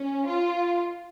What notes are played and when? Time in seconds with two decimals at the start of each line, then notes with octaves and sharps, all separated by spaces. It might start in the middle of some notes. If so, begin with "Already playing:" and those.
Already playing: C#4
0.26 F4